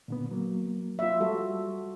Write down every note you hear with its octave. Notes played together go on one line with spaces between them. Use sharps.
A#2 D3 B3
F#3 A#3
F4 E5
G3 F#4 A4